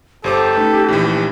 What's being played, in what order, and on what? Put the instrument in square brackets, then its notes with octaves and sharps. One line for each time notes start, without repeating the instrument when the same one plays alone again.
[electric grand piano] G1 C5 D6 [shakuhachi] G4 [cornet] A4
[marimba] A3 C#4 D#4 [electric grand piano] B4
[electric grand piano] A#1 E3